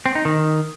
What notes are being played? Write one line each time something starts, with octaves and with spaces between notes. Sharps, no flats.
C4
D#4
D#3